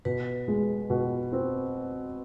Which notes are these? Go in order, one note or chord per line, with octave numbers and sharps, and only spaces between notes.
B2 B4
G#3
B2
C4